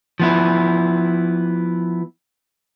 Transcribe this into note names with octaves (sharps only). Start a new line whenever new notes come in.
F3 B3 E4